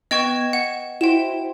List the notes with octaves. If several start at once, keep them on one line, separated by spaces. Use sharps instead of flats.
B3 D#5 G5 C#6 G#6 E7
F#5
E4 F#4 C5 G5 E7